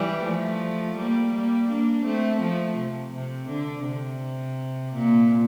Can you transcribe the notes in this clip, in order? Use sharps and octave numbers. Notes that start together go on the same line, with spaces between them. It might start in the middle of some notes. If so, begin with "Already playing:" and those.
Already playing: E3 G3
F3 A3
G3 A#3
G3 A#3
A#3 D4
A3 C4
F3 A3
C3
C3
D3
C3
A#2